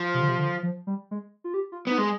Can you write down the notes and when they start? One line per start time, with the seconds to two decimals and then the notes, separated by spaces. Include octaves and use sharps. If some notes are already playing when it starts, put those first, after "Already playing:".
Already playing: F3
0.14 C3
0.22 D3
0.28 C3
0.38 D3
0.63 F3
0.87 G3
1.11 G#3
1.44 F4
1.54 G4
1.72 F4
1.87 B3 D#4
1.98 G#3